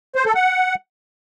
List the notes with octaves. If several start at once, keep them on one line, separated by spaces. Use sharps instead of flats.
C5
A4
F#5